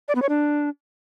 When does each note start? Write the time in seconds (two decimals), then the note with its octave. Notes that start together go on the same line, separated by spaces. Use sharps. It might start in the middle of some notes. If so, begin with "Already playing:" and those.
0.08 D5
0.15 B3
0.22 C#5
0.29 D4